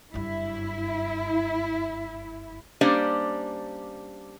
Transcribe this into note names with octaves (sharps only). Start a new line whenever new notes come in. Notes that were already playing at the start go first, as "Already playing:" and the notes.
F#1 G2 E4
G3 A#3 C#4 D4 C5 D5